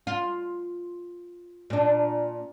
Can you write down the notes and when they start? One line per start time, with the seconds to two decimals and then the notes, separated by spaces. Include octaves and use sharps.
0.07 F4
1.70 A#2 D4